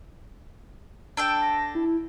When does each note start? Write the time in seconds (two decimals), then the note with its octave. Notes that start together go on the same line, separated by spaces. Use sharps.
1.17 D4 A4 G5 E6
1.42 A#6
1.75 E4